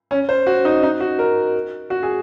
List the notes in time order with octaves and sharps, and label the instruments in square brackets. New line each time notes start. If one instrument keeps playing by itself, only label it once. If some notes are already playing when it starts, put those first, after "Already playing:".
[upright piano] C#4
C5
F#4
D#4
D#4
F#4
A#4
F#4
G#4